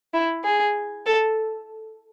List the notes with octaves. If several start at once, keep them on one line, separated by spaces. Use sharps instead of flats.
E4
G#4
A4